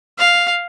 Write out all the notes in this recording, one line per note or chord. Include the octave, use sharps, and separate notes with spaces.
F5